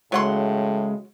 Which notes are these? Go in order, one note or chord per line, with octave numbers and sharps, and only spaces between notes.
A2 C#3 F#3 G#3 F#5 C6